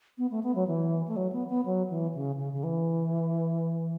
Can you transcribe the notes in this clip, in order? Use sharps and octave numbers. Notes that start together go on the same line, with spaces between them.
B3
A3
B3
F#3
E3
A3
F#3
B3
B3
F#3
E3
C#3
C#3
C#3
E3